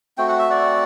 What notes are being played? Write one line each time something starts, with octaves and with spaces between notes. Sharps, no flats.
A3 C4 F#4 G5
F#5
E5
D5 F#5